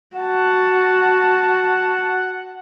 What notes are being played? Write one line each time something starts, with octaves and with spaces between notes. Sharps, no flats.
F#4 F#5 A5